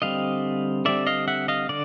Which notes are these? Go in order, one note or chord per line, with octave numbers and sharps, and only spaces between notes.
D3 G3 C4 D#5 F5
D3 G3 C4 D5 E5
D#5 F5
E5 F#5
D#5 F5
D3 D5